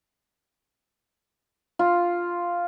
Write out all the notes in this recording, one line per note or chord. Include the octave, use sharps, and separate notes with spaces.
F4